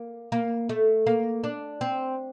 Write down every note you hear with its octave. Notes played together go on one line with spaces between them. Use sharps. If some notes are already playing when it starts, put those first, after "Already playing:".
Already playing: A#3
A#3
A3
A#3
D4
C4